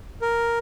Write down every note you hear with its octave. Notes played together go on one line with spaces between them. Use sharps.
A#4